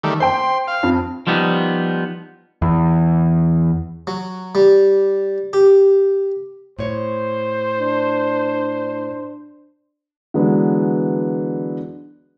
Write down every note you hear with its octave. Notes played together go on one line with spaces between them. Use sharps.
D#3 G3 A3
C5 G5 C6
F5
F2
F3 G3 B3 D#4
E2
F#3
G3
G4
A2 C5 C#5
D4
D3 E3 F#3 G#3 B3 D4